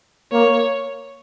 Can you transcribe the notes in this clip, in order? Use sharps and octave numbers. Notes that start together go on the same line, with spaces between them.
A#3 C#5